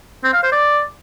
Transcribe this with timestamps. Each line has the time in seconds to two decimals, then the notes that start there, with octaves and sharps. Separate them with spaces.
0.24 C4
0.33 F5
0.43 C5
0.52 D5